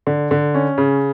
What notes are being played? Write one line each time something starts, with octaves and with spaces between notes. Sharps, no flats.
D3
D3
C#4
C#3